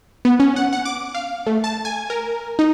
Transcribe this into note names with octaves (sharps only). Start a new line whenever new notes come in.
B3
C#4
F#5
F#5
D6
F5
A3
A5
G#5
A#4
D#4